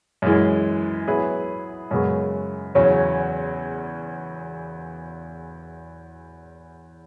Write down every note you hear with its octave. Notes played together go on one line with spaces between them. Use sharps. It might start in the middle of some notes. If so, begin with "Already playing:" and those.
F#2 E3 G#3
F#3 B3 E4 G#4 B4
F#2 C#3 G#3 B3
E2 C#3 F#3 C#4